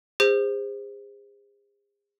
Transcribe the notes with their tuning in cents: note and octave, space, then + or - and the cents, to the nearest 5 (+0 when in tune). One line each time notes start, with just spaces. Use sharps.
G#4 -40 C5 +0